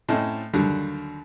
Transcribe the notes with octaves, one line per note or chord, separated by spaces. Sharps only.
A2 C4 C#4 A4 D#5
D#2 D3 F#3 G3